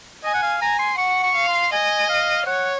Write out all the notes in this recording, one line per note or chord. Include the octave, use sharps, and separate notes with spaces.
D#5 G#5
F#5
F5
G#5 A#5
C6
F#5 C#6
C#6
F5
C6
D#5 G#5
F5
C#5 F#5